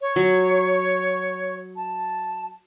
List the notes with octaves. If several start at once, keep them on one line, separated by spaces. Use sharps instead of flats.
C#5
F#3
A5